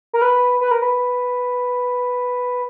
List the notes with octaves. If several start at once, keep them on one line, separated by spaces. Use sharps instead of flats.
A#4
B4
B4
A#4
B4